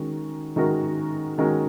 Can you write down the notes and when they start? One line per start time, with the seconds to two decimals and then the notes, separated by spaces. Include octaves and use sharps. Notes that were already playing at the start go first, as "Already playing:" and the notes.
Already playing: D#3 G#3 C#4 F#4 A#4
0.56 D#3 G#3 C#4 F#4 A#4
1.38 D#3 G#3 C#4 F#4 A#4